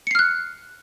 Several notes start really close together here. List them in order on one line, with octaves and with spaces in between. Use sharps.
C#7 C7 F6 F#6